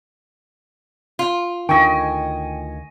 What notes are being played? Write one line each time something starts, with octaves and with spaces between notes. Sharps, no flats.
F4
D2 D3 D#3 D#5 G5 G#5 C#6